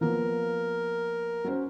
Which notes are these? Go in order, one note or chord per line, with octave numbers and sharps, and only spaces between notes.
F3 A#3 B3 A#4
F#3 C#4 C5